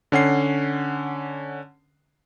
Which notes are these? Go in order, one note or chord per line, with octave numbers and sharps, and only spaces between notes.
D3 C#4 F#5 C7